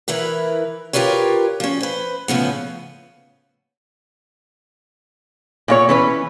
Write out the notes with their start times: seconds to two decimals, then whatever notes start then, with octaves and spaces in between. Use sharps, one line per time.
0.08 E3 E4 A#4 B4
0.93 F4 G4 A#4 B4 C#5
1.60 F3 C#4
1.81 B4 C5
2.28 A2 C#3 F3 B3
5.68 A#2 E4 C#5
5.89 E3 C#4 B4